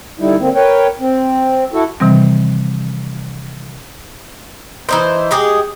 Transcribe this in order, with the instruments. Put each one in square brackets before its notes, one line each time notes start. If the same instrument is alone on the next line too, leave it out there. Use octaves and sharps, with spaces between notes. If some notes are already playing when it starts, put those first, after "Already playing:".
[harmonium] D3 G3 D#4 E4
D3 A#3 C4
A#4 B4 C#5 G5
C4
E4 F#4 A4
[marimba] C3 D#3 E3 G3 C4
[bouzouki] E3 D#4 C5
G#3 G4 G#4